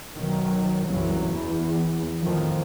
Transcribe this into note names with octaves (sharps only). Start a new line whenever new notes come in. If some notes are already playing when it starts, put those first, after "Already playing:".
B1 D#3 F#3
F#1 C2 E3 F#3
E2
F2 A2 D#3 F3